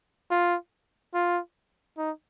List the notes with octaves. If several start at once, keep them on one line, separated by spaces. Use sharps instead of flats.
F4
F4
D#4